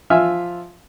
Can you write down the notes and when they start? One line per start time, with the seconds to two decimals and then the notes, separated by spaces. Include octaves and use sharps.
0.10 F3 F4 E5 G#5 F6